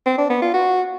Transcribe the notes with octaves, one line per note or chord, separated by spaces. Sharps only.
C4
D4
B3
F4
F#4